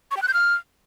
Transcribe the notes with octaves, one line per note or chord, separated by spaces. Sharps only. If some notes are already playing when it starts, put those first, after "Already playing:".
C#6
G5
F#6
G6
F6